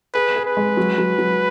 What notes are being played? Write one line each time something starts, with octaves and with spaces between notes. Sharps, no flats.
G#4 B4
G#4
B4
G#3
F#3
F#3
F#3